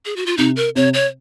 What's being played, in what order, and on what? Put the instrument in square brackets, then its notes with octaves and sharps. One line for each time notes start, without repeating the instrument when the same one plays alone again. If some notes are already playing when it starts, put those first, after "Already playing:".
[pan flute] G#4
F#4
F4
[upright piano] C3 [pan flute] D#4
[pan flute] A#4
[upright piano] C3 [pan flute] C#5
[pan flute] C#5